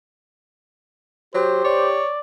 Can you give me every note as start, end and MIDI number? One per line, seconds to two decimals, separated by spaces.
1.35 1.62 54
1.35 2.01 67
1.35 1.89 72
1.64 2.10 73
1.64 2.20 74